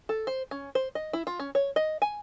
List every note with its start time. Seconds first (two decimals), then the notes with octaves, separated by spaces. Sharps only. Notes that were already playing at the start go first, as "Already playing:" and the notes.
0.09 A4
0.27 C5
0.51 C#4
0.75 C5
0.95 D#5
1.13 E4
1.27 F4
1.40 C#4
1.55 C#5
1.76 D#5
2.02 G#5